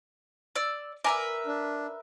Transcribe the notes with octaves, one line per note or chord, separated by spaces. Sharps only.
D5 E6
A#4 B4 D5 E5 G#5 A#5
D4